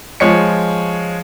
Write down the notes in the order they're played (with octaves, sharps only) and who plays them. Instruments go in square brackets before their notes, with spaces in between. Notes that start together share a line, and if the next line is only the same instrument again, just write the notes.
[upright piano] F3 G#3 C#5 C#7